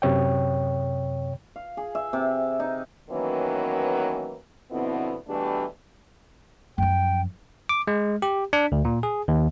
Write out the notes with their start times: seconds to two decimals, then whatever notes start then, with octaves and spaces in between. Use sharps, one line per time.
0.02 F#2 C3 C#5 G5
1.56 F5
1.77 G#4
1.95 E5
2.13 C3
2.60 D#4
3.10 D#3 E3 F#3 A#3 B3 C#4
4.71 F2 B2 D3 B3 C4 E4
5.28 B2 E3 G3 A3 D4 G4
6.78 F#2 F3 G5
7.69 D6
7.87 G#3
8.22 G4
8.53 D4
8.72 D2
8.85 A#2
9.03 G#4
9.28 D#2